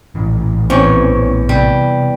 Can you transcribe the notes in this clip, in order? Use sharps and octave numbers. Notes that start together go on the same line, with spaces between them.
A#1 A2 E3
E2 C4 C#4 C#5
C3 G3